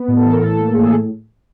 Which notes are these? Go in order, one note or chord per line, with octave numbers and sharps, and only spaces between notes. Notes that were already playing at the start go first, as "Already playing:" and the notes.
Already playing: B3
A2
A4
E3
A#4
A2 A4
A#3
A2 G#4
A4